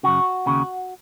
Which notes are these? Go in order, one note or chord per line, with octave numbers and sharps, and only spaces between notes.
F#2 C#3 F#4
D#2 C#3